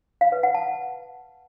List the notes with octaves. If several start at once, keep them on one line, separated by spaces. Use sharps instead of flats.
F5
B4
F#5
A5